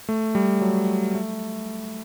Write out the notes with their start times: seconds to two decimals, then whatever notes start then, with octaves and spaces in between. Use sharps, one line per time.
0.09 A3
0.35 G3
0.62 F#3
1.15 A3